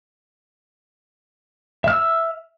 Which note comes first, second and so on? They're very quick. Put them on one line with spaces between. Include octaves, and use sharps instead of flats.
E5 F6 E6